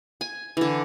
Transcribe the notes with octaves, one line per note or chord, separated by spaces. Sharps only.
G#5
D3 E3